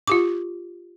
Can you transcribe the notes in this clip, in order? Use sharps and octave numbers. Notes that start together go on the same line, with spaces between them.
F4 G4 D6